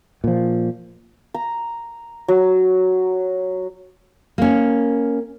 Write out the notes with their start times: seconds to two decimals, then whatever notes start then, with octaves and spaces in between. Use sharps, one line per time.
0.24 A#2 F3
1.34 A#5
2.28 F#3
4.38 A#3 C#4